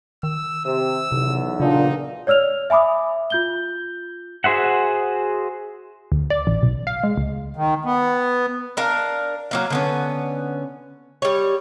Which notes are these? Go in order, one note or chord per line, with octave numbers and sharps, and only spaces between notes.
D#3 E6
C3 E6
B1 E2 C3
A#2 C#3 D4 D#4 F4
C#5 D5 E6 F6 F7
E5 G#5 B5 D6 D#6
F4 G6 G7
F#4 G#4 C5 E5 F#5
D2
D5
A1
B1
F5
G#3
C#2
D#3
B3
D4 A#4 F5
F#3 A#3 F5
D3 B3 C#4
G3 C#5